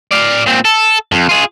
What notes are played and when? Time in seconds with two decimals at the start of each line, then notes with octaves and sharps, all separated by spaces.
0.12 D5 F5
0.47 A#2 C4
0.65 A4
1.12 F2
1.29 F4 G#4